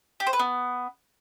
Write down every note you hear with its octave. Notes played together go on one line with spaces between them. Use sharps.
G4
C5
B4
B3